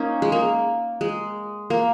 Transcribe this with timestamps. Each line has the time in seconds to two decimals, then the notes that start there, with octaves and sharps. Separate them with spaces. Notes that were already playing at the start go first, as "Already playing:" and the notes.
Already playing: A#3 C#4 D#4
0.22 G#3
0.32 A#3
1.01 G#3
1.70 A#3